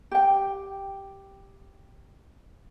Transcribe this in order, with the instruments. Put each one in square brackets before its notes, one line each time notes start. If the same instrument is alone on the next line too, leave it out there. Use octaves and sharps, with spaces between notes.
[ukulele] G4 G5